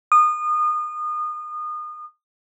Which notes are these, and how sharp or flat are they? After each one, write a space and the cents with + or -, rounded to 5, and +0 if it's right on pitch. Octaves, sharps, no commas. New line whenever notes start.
D#6 -30